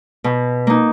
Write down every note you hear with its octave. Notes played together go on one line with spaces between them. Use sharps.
B2
A#3 D#4